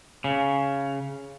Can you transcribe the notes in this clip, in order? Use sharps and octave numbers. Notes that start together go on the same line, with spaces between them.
C#3